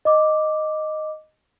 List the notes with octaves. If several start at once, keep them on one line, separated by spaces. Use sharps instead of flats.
D#5 D6